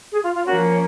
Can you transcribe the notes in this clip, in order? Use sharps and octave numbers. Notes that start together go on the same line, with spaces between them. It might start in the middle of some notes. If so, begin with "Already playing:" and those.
G#4
F4
F4
F3 A#3 C#4 F#4